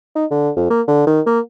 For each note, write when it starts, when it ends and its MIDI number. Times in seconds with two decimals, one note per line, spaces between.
0.15 0.25 63
0.31 0.50 50
0.56 0.66 41
0.70 0.82 58
0.88 1.05 50
1.07 1.21 51
1.26 1.40 58